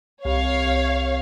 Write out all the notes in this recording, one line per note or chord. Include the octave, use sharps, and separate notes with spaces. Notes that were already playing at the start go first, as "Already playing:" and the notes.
C2 C#5 F5
C2